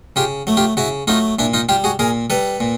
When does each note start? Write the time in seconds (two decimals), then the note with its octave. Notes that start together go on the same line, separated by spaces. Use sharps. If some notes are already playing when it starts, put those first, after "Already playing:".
0.16 C#3 F4 G4
0.47 F#3 A3
0.57 F4 G4
0.77 C#3 E4 F#4
1.07 F#3 A3 D#4 F4
1.39 A#2 D4 E4
1.54 D#4 F4
1.69 G3 F4 G4
1.84 F#4 G#4
1.99 A#2 G#4 A#4
2.30 G3 A4 B4
2.60 A#2